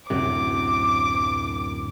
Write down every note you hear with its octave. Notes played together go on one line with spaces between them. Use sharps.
D1 F#2 C3 D6